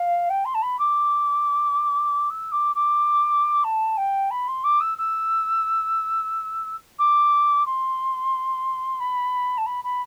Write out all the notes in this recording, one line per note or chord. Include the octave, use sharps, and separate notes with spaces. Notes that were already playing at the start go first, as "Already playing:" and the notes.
Already playing: F5
G5
C6
A5
B5
D6
E6
D6
D6
A5
G5
B5
C6
D6
E6
E6
D6
C6
B5
A5
B5
B5